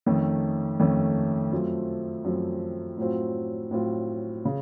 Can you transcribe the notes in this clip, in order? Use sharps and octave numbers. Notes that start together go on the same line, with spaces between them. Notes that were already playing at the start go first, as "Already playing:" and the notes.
F2 D#3 A3 C#4
F2 D#3 A3 C#4
F#2 F3 A3 C4
F#2 F3 A3 C4
A2 F#3 C4 F4
A2 F#3 C4 F4
C#3